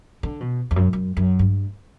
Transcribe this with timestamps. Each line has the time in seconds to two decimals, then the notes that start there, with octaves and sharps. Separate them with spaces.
0.23 D3
0.41 B2
0.71 E2
0.76 F#2
0.93 F#2
1.17 F#2
1.39 G2